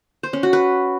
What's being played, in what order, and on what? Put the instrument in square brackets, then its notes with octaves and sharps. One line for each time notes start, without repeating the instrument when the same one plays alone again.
[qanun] C5
C#4
F#4
B4